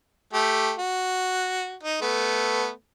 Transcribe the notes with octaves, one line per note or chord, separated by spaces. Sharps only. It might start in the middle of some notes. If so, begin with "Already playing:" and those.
A3 G4
F#4
D#4
A3 B3